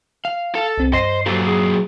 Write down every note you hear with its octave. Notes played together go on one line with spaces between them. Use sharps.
F5
A4
C2 C4
G2 C5 D#5 C7
A#2 F#3 G4 A4 C5
G#4